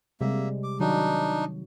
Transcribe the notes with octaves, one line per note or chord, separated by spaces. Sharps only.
C3 G3 G#3 A#3 E5
D6
D#3 F#3 D4 D#4 F#4